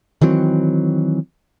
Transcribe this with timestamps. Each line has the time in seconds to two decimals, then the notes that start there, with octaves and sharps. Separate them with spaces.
0.21 D#3 E3 F#3 C4